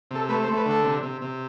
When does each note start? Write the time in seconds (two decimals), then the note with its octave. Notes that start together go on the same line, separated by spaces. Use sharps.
0.11 C3 A4
0.29 A3 B4
0.43 C5
0.48 A3
0.57 B4
0.66 D3 A4
0.84 C3
1.03 C3
1.21 C3